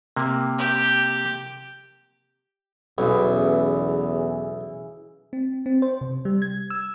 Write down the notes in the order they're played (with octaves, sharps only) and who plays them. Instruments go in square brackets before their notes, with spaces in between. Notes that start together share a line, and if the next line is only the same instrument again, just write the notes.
[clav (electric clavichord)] C3 A#3
[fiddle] G4
[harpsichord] B1 [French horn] E2 [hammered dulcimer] C#3 E3 E4
[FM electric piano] C4
C4
C5
C3
G3
G#6
E6